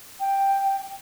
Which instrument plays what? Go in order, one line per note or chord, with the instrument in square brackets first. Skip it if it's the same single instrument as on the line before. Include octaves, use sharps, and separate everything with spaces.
[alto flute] G5